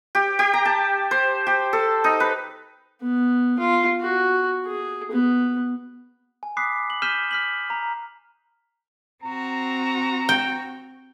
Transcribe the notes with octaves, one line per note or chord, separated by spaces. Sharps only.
G4
G4
A#5
A5
C5
G4
A4
D#4
B4
B3
F4
F#4
G#4
B3
G#5
B5 D6 D#6 F#6 B6 C7
F#7
F6 G6 B6 D#7 E7 G7
F6 B6 F#7
A#5
C4 F#4 A#5
G5